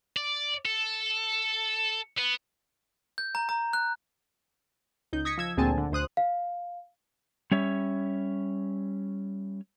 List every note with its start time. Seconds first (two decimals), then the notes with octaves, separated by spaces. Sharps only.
0.17 D5
0.66 A4
2.18 B3
3.18 G6
3.35 A#5
3.49 A#5
3.73 F#6
5.13 C#2 D#4 G6
5.25 D#6 G#6 A#6 B6 C#7
5.38 F3 E6 G#6
5.57 D2 A#2 C4 G#4 G#5 A5
5.77 D3
5.92 D2 C5 D#6 F#6
6.17 F5
7.51 G3 C#4 C#5 E5